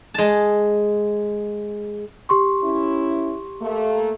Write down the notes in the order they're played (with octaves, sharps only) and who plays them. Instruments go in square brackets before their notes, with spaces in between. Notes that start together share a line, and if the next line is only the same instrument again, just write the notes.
[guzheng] G#3 A5
[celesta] G4 C6 C#6
[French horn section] C#4 E4
A3 A#3